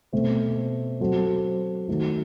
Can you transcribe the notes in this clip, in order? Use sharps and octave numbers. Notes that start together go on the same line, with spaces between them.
B2 A3 C4
F#3 C4 F#4 A4 C5
D#3 A3 D#4 F#4